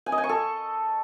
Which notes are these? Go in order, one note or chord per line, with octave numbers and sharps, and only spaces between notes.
G#5
D#5
G#5
C#6
A4